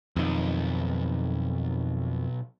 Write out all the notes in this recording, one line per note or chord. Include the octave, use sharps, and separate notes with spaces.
B1 F2 D#3